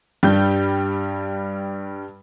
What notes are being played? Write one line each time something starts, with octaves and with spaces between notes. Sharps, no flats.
G2 G3 G6